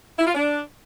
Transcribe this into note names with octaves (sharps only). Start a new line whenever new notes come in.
E4
F4
D4